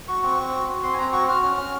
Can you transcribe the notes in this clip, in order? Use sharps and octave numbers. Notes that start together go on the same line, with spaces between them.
F#4 C#6
C4 C#6
C4
F#4
F#4
C4 C6
G#5
C4 A#5
F#4 C#6
F#4 F6
C#4 F6
C#4